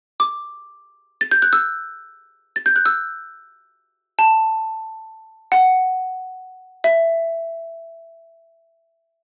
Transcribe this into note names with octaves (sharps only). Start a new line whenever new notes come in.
D6
A6
G6
F#6
E6
A6
G6
F#6
E6
A5
F#5
E5